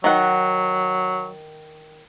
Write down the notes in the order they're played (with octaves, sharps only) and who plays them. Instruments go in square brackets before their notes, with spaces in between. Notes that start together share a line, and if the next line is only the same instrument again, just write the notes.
[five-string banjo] D#3 F#5 [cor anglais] F#3